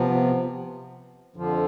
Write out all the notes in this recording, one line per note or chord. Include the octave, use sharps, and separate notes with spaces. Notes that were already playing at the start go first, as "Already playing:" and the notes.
Already playing: C3 F3 B3
F2 D3 F3